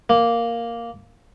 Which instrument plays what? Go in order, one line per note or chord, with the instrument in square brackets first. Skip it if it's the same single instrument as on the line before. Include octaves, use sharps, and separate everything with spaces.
[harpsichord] A#3